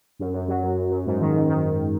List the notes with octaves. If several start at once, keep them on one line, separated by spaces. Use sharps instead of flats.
F#2
F#2
F#3
F#2
F#2
F#2
G#2
D#3
G#2
D#3